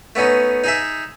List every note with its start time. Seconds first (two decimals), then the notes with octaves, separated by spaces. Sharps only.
0.15 A3 B3 C#4 D#4
0.64 D#4 G#4 E5